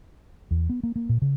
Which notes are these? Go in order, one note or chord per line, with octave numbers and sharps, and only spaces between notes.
E2
B3
A#3
A#3
A#2
C#3